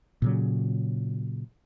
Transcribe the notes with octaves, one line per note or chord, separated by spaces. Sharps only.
A#2 C#3 F#3